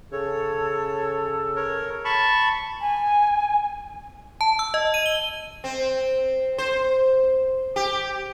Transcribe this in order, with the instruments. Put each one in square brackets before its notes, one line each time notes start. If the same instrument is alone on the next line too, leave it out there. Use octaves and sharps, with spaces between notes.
[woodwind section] C#3 A4 [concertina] C#5
[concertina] A#4 C#5
A5 B5 C#6
[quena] G#5
[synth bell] A5
E6
D#5
D#7
G7
[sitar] C4
C5
G4